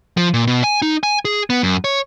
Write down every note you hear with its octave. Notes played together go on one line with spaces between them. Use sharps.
F3
A#2
B2
G#5
D#4
G#5
G#4
B3
F#2
C#5